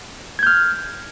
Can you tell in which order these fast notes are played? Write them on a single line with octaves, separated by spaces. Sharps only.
G#6 G6 F6